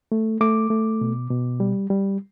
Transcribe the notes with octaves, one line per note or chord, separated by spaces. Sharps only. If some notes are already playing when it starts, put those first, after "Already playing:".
A3
A3 D6
A3
B2
B2
G3
G3